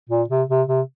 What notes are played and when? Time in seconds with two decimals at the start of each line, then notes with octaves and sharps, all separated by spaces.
0.10 A#2
0.29 C3
0.49 C3
0.68 C3